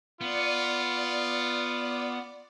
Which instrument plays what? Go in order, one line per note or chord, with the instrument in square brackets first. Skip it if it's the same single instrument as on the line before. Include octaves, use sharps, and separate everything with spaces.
[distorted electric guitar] B3 [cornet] F4 [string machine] D5